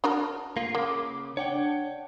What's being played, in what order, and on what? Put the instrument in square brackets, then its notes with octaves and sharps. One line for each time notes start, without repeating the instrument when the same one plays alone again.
[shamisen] D4 F#4 A#4
[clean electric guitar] A#3 F4 [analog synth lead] C7
[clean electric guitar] C#3 [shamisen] A#3 [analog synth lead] D6
[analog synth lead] D4 [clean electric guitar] C#5 F#5 G5